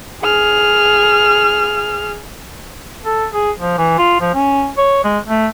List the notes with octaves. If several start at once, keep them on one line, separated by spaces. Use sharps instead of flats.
G#4 F6
A4
G#4
F3
E3
F4
F3
C#4
C#5
G#3
A3